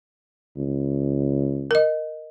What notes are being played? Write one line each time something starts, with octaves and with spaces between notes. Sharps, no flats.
C#2
A#4 D#5